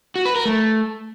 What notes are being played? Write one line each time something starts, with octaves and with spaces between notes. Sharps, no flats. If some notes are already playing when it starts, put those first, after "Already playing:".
F#4
B4
A#4
A3